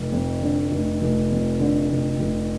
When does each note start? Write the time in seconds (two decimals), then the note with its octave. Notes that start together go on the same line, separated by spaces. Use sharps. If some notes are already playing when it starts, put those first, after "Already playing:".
Already playing: F1
0.12 F2
0.42 D3
0.72 F1
1.01 F1
1.31 F2
1.60 D3
1.90 F1
2.19 F1